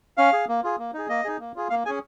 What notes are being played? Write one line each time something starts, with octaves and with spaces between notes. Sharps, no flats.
C#4 F5
G#4
A#3
F4 G#4
A#3
D#4 G#4
A#3 D#5
D#4 G#4
A#3
F4 G#4
A#3 F5
C#4 G#4 G#5